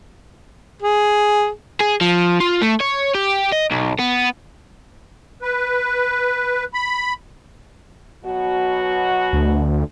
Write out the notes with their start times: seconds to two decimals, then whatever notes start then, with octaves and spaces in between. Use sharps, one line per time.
0.82 G#4
1.80 G#4
2.01 F3
2.40 F4
2.62 A3
2.81 C#5
3.15 G4
3.52 D#5
3.71 B1
3.99 B3
5.42 B4
6.74 B5
8.26 B2 F#3 F#4
9.33 D2